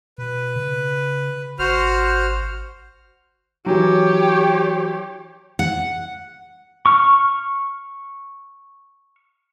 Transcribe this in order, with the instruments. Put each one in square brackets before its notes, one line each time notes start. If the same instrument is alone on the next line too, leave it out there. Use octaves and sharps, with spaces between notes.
[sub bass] B2 [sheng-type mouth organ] B4
[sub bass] C#3
[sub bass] G#1 [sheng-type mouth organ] F#4 C5 F6
[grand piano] E3 F#3 [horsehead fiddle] G4 C#5
[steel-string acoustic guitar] F#5
[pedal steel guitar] C#6 F6